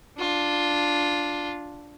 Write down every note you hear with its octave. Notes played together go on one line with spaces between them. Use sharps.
D4 F4